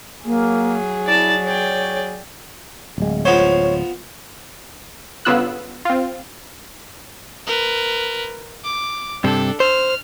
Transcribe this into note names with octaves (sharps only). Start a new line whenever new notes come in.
F#3 A#3 G#4
E4 D5 A5
C#5 D5 G5
D1 G#3
F3 B3 C5 C#5
G1 C#3 B3 F4 E6 F#6
C4 F4
A#4 B4
D6
G2 C3 D4 A4
C5 F6